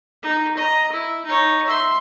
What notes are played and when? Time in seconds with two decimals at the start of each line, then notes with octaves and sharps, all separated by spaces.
0.23 D#4
0.57 D#5 A#5
0.92 E4
1.25 D#4 C#5
1.67 E5 C6